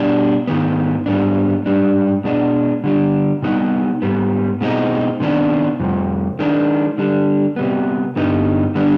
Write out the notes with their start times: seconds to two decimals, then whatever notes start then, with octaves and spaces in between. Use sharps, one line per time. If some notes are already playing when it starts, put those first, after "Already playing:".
Already playing: B2 G3 D4
0.47 G#2 D#3 B3
1.06 G#2 G3 B3 D4
1.66 G#2 G3 D4
2.24 B2 G#3 D4
2.84 D3 G3 D4
3.42 C3 G3 B3 D#4
4.02 G#2 G3 B3
4.61 B2 G#3 C4 D#4
5.20 C3 D#3 B3 D4
5.80 F2 C3 G3
6.39 D#3 G#3 D4
6.98 D3 G3 D4
7.56 C3 G3 B3
8.16 G2 D3 G3 B3 D#4
8.75 D3 G3 B3 D4